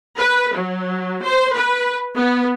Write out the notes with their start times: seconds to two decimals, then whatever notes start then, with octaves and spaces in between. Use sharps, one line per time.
0.18 B4
0.56 F#3
1.24 C5
1.55 B4
2.15 B3